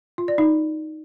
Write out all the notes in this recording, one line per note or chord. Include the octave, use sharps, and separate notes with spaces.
F4
D5
D#4